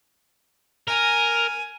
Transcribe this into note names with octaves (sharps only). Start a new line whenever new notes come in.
A#4 G#5